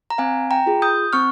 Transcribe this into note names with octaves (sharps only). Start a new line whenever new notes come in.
A#5
C4 F5 G#5
G5 A#5
F4 G#4
D#6 G6
C4 C#6 F6